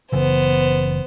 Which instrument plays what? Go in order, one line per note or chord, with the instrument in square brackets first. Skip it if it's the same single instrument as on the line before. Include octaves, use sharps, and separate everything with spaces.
[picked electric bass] F#1 C#3 E3 [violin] B3 C5